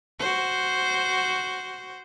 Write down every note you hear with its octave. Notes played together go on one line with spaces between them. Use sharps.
F#4 C5